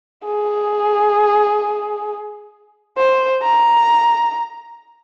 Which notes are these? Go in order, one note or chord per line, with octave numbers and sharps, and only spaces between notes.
G#4
C5
A#5